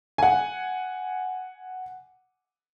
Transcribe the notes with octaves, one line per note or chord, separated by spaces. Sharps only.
F#5 G#5